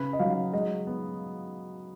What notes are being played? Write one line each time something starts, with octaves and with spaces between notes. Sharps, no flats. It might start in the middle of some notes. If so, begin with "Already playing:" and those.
Already playing: C#3 B4
D#5
F#3 F5
G#3 D#5
B3